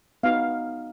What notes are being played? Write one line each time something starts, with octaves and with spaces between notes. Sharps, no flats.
B3 D#4 F#4 F5